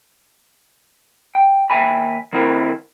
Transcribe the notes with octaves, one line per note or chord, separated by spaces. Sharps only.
G5
D#2 E5 G5 G#5 B5
D#3 C4 E4 A#4 C5